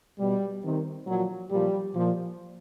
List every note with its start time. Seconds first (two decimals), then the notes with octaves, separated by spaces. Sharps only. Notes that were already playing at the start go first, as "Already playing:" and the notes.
0.20 B2 G3
0.63 C3 D#3
1.07 A#2 F3 F#3
1.50 A#2 F3 G3
1.94 A#2 F3